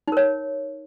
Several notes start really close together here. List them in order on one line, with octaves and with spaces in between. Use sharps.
D#4 A#4 C#5